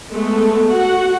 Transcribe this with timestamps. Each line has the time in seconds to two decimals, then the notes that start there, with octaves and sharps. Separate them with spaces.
0.11 G#3 A3 B3 A4
0.69 F#4 F#5